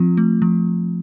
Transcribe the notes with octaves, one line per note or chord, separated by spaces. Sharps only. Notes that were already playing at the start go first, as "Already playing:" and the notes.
Already playing: F3 C4 F4
A3
F3